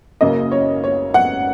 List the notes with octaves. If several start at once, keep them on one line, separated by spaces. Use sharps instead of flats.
F#1 F#2 C#3 A#3 D#5
C#5
C#5
F#5